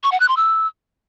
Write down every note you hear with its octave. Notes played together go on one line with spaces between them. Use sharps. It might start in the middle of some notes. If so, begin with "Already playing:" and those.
C#6
F#5
F#6
C6
E6